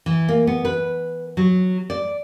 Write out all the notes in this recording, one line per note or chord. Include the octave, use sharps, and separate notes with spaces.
E3
A#3
B3
B4
F#3
D5